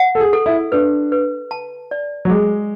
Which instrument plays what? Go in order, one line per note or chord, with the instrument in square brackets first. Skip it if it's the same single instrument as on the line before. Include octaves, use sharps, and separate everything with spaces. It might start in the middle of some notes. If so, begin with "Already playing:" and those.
Already playing: [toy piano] F#5
[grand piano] A4
G#4
[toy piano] A4
[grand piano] E4
[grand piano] D4 [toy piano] B4
[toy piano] B4
A5
D5
[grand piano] F#3
[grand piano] G#3 [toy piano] G#4